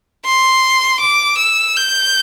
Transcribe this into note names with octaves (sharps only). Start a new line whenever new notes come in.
C6
D6
E6
G6